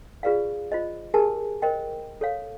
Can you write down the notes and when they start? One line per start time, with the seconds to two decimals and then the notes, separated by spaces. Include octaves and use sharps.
0.23 F4 G#4 B4 D5 F5
0.72 F4 C5 D#5
1.14 G4 G#4 A#4 B4 G#5 A5
1.62 A#4 C5 D#5 G5
2.21 A4 C#5 F5